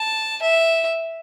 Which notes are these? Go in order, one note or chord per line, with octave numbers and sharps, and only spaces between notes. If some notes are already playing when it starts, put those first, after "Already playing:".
Already playing: A5
E5